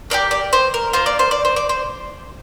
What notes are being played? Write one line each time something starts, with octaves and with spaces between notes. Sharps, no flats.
A#3 D4 G4 D5
D5
C5
A#4
A#3 F4 C5
D5
C5
D5
C5
D5
C5